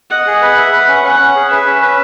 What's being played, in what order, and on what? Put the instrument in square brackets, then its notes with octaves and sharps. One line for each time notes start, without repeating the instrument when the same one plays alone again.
[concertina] D#5 [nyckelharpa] F#5
[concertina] G#4
B4
E5
B4
C#4
[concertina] C#4 [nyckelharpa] F#5
[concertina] C#4
G#4
[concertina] B4 [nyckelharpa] E5
[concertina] C#4
B4